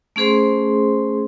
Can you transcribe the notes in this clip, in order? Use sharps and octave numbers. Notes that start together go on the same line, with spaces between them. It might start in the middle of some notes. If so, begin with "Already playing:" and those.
A3 C#4 G#4 C5 C6